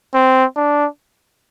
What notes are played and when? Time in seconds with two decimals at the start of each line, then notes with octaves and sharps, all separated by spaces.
0.14 C4
0.56 D4